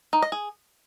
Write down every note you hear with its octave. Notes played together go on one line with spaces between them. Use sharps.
D#4
D#5
G#4